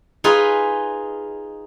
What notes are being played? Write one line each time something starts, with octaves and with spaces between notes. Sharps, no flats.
D#4 F4 G#4 B4